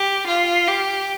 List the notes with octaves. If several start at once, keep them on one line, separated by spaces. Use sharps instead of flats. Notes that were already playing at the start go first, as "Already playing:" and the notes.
Already playing: G4
F4
G4